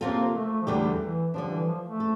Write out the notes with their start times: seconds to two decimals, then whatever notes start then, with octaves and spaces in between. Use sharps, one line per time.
0.01 C3 F3 A#3 C4 F4 A4
0.34 A3
0.62 F3
0.67 E2 D3 G3 A3 E4 G4
1.01 E3
1.34 D3 F3 G3 D4
1.51 E3
1.67 F3
1.84 A3
2.00 A4